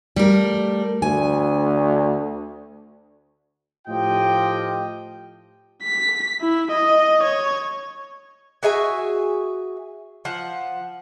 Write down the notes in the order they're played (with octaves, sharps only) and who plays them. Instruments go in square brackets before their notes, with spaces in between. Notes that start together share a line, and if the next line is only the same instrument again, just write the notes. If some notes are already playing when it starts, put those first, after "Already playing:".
[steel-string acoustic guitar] G3 A3 A#4
[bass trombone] D2 [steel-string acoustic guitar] G#5
[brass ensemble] A2 F3 F4 G4 D#5 G5
[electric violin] B6
E4
D#5
C#5
[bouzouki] F#4 G#4 E5 G#5
F3 F#5